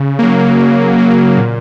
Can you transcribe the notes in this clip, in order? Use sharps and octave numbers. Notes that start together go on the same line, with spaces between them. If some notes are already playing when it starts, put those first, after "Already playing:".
Already playing: C#3
F#3 A#3
C#3
F#3 A#3
A#2